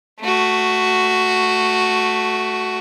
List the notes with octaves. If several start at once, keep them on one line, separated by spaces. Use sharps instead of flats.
A3 F#4